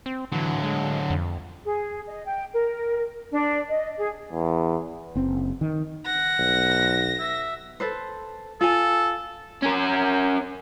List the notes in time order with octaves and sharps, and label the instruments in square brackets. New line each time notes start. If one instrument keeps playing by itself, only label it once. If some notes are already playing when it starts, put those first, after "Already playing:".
[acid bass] C4
[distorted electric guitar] D3 F#3 [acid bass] E3
[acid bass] G#3
F2
[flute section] G#4
D#5
G5
A#4
D4
D#5
G#4
[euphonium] E2
[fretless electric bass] F#1 C4
D#3
[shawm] F#5 [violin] A#6
[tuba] B1
[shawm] E5
[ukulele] A4 B4 C5
[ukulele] F4 G#5 [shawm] A4
[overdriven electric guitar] C#4 A#4